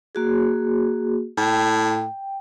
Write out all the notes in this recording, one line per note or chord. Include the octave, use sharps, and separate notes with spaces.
A#3 F#4 G#4
A2 G5